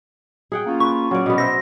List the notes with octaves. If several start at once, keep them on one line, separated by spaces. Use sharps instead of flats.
G#4 F#5 G5
A#3 C#4 F4
B4 C#6
F#3 C#4 D5
B2 B3
C5 E5 A#6